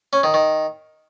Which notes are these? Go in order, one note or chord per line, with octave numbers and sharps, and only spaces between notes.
C#4
D#3
D#3